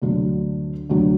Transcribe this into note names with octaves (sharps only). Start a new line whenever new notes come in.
D2 D3 F#3
D2 D3 F#3